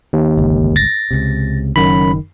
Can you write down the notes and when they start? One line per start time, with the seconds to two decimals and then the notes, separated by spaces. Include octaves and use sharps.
0.13 D#2
0.37 G1 C#2
0.76 A6 A#6
1.11 C#2 C3
1.76 F#1 F#2 D#3 B5